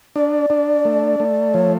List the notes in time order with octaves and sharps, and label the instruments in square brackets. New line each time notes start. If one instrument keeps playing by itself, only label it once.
[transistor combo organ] D4 [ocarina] D5
[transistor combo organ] D4
A3
A3
[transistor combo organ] F3 [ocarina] C#5